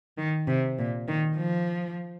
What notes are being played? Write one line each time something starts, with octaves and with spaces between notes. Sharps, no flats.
D#3
C3
A#2
D#3
F3